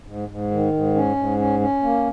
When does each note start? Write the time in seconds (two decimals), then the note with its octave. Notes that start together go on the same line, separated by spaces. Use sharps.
0.07 G#2
0.29 G#2
0.51 D#3
0.73 G#2
0.95 C#4
1.16 G#2
1.38 C#4
1.60 C#4
1.83 A#3